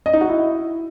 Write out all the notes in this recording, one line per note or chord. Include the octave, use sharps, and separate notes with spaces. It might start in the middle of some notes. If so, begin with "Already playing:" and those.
D#5
D#4
F#4
E4